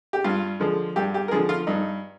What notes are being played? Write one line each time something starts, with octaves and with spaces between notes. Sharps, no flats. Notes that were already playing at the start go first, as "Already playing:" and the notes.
G4
G2 F4
D3 F3 G#3
G2 G4
G4
A#4
D3 F3 G#3 G#4
F4
G2 D#4